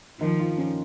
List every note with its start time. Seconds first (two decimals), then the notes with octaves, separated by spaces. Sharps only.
0.20 D#3 F3
0.39 F4
0.58 C#4